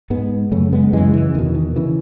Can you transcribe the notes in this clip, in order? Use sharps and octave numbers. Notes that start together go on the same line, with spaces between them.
G#2 G#3 B3
F#2 C#3 A3 C#4
G#3 B3
F#2 C#3 E3 G#3
E3
E2 B2 D#3
D#3
C#3 E3